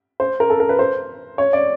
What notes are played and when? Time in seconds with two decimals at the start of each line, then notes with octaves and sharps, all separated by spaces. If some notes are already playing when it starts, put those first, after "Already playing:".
0.20 C5
0.40 A#4
0.50 A4
0.60 A#4
0.69 B4
0.79 C5
1.38 C#5
1.53 D5